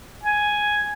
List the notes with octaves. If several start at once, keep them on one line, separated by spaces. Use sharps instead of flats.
G#5